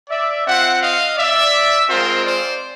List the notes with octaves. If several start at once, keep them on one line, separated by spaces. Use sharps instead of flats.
D5 E5
C4 F4 E5 F#5
D#5 F5
D5 E5
G#3 C4 F4 A#4 C5
C5 D5